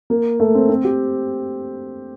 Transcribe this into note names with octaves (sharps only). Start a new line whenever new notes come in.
A#3
A3
C4
C4
G4